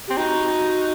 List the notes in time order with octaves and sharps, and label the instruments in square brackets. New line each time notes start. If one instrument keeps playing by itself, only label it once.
[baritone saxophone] C4 [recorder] G4
[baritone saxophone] D#4 [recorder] F#4